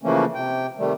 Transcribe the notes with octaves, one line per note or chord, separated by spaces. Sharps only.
C#3 E3 F3 A3 A#3 C#4
C3 G5
C3 D#3 G3 A3